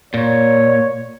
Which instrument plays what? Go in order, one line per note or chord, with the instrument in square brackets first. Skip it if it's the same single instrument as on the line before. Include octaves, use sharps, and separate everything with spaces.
[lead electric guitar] A#2 [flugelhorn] C#5